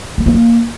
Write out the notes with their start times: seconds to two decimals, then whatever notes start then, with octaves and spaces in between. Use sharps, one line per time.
0.18 A3
0.26 B3
0.34 A#3